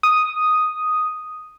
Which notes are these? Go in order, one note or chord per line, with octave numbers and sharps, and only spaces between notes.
D#6